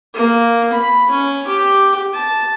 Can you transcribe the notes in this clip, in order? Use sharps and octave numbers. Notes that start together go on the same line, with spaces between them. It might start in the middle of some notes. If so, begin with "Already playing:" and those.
A#3
B5
C#4
G4
A5